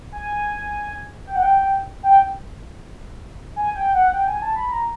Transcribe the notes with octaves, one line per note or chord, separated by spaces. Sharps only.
G#5
G5
F#5
G5
G5
G#5
G5
F#5
G5
G#5
A5
B5
A#5